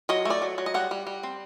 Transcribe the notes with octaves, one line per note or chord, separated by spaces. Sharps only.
F#3 D#5
A3 D5
F#3
F#3
D#5
G3 F#5
G3
G3
C4